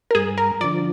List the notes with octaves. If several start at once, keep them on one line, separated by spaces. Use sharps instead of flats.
A#4
G2 G#4
A#4
D3 F3 D5